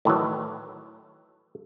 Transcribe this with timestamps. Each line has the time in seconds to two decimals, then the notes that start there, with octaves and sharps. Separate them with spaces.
0.05 A2 D#3 E3 F#3